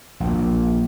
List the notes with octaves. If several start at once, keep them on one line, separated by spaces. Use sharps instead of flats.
A#1 A#2